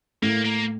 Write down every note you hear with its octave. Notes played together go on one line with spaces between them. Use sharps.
A2 A#3
A#3